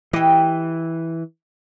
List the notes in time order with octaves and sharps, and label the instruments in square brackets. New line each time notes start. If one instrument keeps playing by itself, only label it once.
[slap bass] E3 [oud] G4 D#5